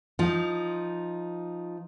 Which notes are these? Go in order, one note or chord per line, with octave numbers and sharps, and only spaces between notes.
F3 D#4